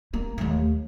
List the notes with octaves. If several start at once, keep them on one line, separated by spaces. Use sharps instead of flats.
A#3
D#2 A3